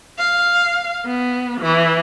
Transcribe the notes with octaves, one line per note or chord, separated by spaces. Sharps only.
F5
B3
E3